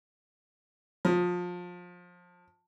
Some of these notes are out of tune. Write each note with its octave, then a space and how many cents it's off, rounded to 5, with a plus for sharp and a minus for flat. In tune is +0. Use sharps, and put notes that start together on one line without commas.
F3 +25